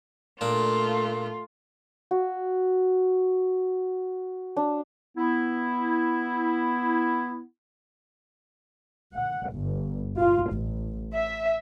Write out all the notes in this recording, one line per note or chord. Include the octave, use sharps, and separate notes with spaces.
A#2 A3 D4 F4
F#4
D4
B3 E4
F#5
G1
F4
A1
E5